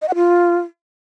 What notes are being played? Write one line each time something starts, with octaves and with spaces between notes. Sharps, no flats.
D#5
F#5
F4